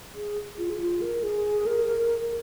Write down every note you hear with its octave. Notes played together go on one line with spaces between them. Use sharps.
G#4
F4
G#4
F4
A#4
G#4
A#4